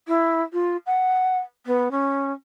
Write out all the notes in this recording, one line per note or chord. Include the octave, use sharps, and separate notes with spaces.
E4
F4
F#5
B3
C#4